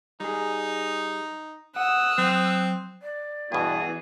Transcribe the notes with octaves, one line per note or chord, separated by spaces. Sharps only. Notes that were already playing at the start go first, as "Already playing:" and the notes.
G3 D#4 G#4
F#5 D#6 E6 F#6
F#3 C4
D5
G2 B2 E3 B3 F#4 G#4